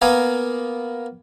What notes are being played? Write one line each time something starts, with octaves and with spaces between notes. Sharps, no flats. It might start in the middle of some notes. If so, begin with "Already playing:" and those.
A#3 B3 A#4 F5 G#5